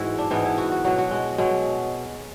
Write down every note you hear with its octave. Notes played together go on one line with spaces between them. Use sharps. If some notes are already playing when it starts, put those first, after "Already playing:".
Already playing: G#2 E3 E4 F#4
D4
G#2 E3 B3
E4
F#4
F#4
B2 F#3 F#4
F#4
G#3
B2 F#3 G#3